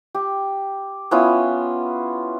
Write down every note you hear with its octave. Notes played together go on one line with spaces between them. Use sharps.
G4
B3 C#4 E4 F4